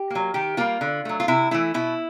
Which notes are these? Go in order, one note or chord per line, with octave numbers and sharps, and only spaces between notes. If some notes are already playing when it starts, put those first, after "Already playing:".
Already playing: G4
F#3 A#3
D#3 G4
G3 A#3 F4
D3
F#3 A3
F4
C3 E4
E3 A3 E4
B2 E4